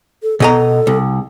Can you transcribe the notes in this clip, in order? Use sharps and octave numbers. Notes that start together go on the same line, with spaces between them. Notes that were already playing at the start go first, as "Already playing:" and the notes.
A4
B2 A4 D#5 A#5
C2